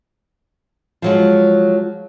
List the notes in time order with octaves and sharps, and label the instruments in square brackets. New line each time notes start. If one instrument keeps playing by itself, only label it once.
[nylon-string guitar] F3 F#3 G#3